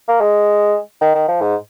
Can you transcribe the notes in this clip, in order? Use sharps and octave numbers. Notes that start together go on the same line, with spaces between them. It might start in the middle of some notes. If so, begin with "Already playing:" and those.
A#3
G#3
D#3
D#3
F3
G#2